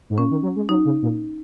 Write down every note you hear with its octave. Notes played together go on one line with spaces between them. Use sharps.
G#2
A#2 C#4
D#3
F#3
G#3
F#3 D#4
C#3
A#2